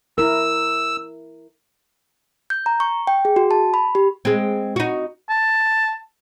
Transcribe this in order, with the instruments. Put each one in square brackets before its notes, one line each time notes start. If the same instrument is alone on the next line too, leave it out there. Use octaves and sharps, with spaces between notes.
[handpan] E4 A#4 [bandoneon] E6
[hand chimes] G6
A#5
C#6
G5
G#4
F#4
A5
B5
G4
[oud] G#3 C4
D#4 F#4
[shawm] A5